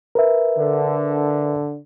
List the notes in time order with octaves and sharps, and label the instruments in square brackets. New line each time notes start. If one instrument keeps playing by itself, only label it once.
[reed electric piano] A#4 B4 E5
[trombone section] D3